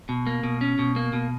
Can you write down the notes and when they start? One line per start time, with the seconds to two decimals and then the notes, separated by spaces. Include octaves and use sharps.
0.09 B2
0.27 A#3
0.43 B2
0.61 C#4
0.79 B2
0.96 A#3
1.13 B2